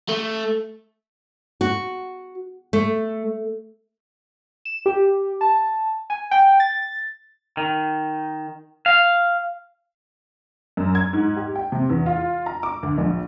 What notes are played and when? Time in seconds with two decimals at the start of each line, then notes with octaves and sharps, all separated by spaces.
0.09 A3
1.61 F#4
2.73 A3
4.65 E7
4.86 G4
5.41 A5
6.10 G#5
6.31 G5
6.60 A6
7.57 D#3
8.86 F5
10.77 F#2
10.95 G#6
11.13 G#2
11.36 G4
11.56 G5
11.72 C3
11.90 E2
12.06 F4
12.46 A#5
12.63 D6
12.83 D2
12.98 A#1